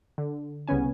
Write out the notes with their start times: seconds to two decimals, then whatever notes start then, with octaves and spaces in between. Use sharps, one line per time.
0.18 D3
0.68 C2 C#3 B3 C#4 G#5